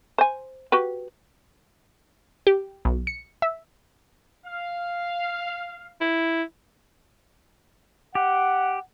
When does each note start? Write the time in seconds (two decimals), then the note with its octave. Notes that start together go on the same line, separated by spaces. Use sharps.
0.18 C5 G#5
0.72 F#4 G4 B4
2.47 G4
2.85 B1
3.07 C#7
3.42 E5
4.46 F5
6.01 E4
8.15 G4 F#5